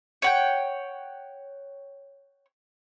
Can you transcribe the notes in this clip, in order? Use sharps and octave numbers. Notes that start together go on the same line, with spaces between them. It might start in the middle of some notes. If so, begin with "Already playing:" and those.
C#5 F#5 G5